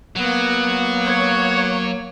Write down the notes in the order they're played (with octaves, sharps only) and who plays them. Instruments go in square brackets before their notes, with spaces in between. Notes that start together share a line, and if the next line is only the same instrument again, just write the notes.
[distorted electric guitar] F#3 [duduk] A#3 [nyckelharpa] B3 F#5
[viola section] C#5